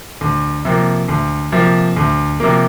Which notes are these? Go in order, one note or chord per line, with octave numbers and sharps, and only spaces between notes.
D2
C3 F3 A#3
D2
C3 F3 A#3
D2
C3 F3 A#3